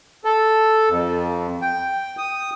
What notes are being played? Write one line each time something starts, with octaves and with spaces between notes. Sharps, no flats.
A4
F2
G5
D#6